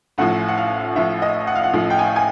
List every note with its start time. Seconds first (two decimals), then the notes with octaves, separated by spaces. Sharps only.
0.18 A1 A2 F3 F#5
0.48 F#5
0.57 F5
0.96 A1 A2 F3 E5
1.22 D#5
1.47 F#5
1.55 F5
1.64 F#5
1.73 A1 A2 F3
1.90 G5
1.99 G#5
2.16 G#5